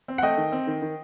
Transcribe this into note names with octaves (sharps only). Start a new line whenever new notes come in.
C4
F#5
A3 D#5 G5
D#3
C4
D#3
D#3